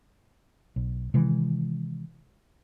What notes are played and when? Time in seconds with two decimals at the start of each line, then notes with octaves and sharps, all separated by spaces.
0.76 B1
1.14 C3 D#3 E3 G#3